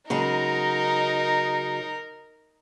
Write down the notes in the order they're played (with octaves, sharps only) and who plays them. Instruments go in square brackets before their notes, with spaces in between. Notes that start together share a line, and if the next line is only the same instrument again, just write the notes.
[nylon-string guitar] C#3 F#3 G#3 [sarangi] D#4 [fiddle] A#4